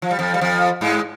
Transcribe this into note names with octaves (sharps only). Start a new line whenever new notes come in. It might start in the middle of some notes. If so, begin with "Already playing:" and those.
F3
G3
F2 F3
G3
F2 F3
G#2 G#3